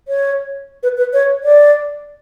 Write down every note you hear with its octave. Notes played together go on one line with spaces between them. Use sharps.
C#5
B4
B4
C#5
D5